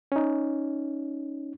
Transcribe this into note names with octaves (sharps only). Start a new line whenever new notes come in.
C#4 D#4